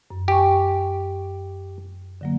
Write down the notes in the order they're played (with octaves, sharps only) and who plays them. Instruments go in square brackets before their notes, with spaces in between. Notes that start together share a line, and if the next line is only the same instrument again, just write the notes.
[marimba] F#2
[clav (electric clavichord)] G4 [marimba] G5 G#5 C#6
[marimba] D3 F#3 A#3